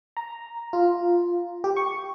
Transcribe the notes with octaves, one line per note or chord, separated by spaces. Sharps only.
A#5
F4
G4
C#6